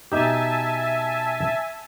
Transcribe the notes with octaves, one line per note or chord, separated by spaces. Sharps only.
B2 D#4 G4 E5 G#5 A5